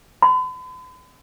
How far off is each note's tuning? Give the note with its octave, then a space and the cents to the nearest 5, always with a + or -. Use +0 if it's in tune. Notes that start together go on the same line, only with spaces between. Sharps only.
B5 +45